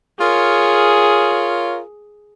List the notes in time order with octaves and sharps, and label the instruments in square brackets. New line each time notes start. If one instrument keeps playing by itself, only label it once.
[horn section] F4 A#4 C#5 [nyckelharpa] G#4